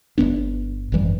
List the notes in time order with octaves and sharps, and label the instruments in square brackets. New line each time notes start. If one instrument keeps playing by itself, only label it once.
[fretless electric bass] G1 G#2 B3 D4
G#1 F#2 E3 G3